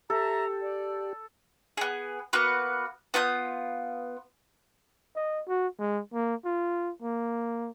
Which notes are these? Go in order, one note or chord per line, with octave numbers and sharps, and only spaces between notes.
G4 A4 E5 A5 A#5
D5
B3 G#4
A#3 B3 F#4 B4
B3 F4 D#6 G6
D#5
F#4
G#3
A#3
F4
A#3